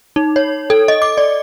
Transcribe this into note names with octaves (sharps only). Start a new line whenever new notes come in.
D#4
C#5
A4
D#5
D6
D5